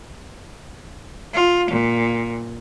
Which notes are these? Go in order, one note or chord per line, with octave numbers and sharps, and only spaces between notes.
F4
A#2